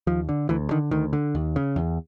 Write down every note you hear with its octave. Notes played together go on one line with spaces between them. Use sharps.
D#2 F3
D3
D2 E3
D3 D#3
D2 D#3
D3
D#2
C#3
E2